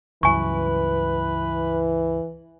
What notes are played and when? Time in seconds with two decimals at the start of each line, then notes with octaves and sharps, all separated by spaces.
0.23 C#2 G2 E3 F#3 B4 G#5 C#6